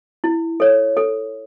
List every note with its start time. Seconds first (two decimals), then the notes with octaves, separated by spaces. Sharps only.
0.24 E4
0.60 A4 C#5
0.97 A4